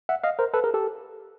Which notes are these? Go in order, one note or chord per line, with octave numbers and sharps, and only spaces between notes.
E5 F#5
D#5 F5
A#4 C5
A4 B4
G#4 A#4
G4 A4